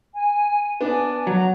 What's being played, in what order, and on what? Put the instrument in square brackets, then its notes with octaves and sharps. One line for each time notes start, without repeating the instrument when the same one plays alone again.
[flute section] G#5
[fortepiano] B3 D4 [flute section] G#5
[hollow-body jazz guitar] F#3 [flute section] A#5